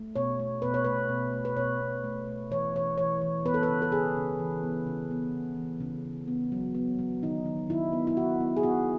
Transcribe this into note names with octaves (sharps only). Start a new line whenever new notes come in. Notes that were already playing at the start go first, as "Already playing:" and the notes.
Already playing: A3
B2 C#5
A3
B2 B4
C#5
A3 B4
B2
A3
B4
B2 C#5
B2
A3
A3
E3 C#5
E3 C#5
E3 C#5
E3
B3 B4
A4
B4
C#3
A4
C#3 G#4
C#3
E3
B3
C#3
B3
C#3
E3
C#3
C#3
B3
F#3
B3
F#3
D#3 D#4
D#3
D#3 E4
B3
E4
B3 F#4
B3
G#4
B3 F#4